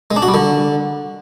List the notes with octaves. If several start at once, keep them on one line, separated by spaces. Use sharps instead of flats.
G#3
D4
F#4
G3
D3